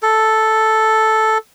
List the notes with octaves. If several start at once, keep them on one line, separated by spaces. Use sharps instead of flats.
A4